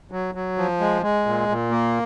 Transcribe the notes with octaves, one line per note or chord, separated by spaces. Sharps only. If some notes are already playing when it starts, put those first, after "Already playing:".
F#3
F#3
F3
G#3
G#3
A#2
A#2
A#3